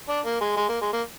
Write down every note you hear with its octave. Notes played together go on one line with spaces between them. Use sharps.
D4
A#3
G#3
G#3
A#3
G#3
A#3